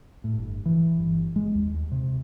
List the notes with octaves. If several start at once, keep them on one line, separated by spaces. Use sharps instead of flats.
A2
G1
E3
G1
G#3
D#2
C3